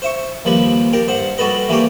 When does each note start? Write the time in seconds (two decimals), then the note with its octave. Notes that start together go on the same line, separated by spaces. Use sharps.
0.02 C5 E5 C#6
0.45 D#2 F3 G3 B4
0.93 D4 G4 A#4
1.08 G2 C5 F#5
1.38 G3 F#4 A4 B4 D#5
1.69 E3 G3 A#3 G4 C#5